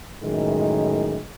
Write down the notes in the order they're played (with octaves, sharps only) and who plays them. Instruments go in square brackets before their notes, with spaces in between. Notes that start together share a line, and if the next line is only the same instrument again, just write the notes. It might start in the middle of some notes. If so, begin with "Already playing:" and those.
[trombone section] F#2 A2 D#3 E3 G#3